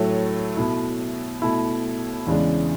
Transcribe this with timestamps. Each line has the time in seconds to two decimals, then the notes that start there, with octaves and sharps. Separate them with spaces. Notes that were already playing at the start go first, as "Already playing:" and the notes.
Already playing: A2 F#3 A3
0.57 B2 A3 E4
1.42 B2 A3 E4
2.27 E2 C#3 E3 G#3 D4